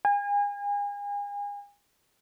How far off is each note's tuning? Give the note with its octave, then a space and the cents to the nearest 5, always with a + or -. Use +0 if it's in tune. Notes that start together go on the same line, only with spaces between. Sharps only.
G#5 -35